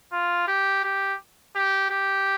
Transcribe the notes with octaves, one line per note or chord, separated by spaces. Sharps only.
F4
G4
G4
G4
G4